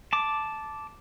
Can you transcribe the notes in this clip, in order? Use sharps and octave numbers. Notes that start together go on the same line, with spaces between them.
A5 D6